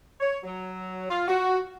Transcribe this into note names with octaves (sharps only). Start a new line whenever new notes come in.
C#5
F#3
F4
F#4